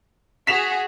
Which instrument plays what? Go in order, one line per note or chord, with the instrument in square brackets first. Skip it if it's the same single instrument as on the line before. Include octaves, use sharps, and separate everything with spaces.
[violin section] F#4 G#4 [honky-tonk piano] B6 E7 F7